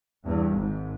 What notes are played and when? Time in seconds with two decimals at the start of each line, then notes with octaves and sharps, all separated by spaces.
0.25 E2 G2
0.54 G#1 G#2